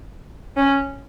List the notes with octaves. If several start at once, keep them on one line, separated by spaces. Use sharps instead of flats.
C#4